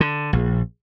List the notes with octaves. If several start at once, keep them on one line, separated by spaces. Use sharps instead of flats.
D3
A#1